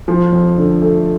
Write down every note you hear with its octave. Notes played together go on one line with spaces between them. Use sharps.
F3
F2
D3
A3